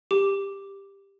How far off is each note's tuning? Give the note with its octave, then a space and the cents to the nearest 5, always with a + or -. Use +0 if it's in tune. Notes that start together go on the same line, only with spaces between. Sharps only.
G4 +10 D6 +0